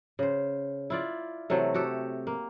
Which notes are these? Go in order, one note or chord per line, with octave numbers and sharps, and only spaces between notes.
C#3 C5
E4 F4 D5
C3 E3 F#3 A3
F#4 G4 A4
A#3